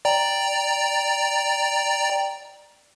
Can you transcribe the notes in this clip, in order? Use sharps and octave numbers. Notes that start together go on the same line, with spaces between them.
D5 G5 A#5